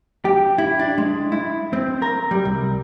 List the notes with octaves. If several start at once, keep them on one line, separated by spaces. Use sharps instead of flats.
G4
E4
D4
G#3
E4
C4
A#4
G3
C2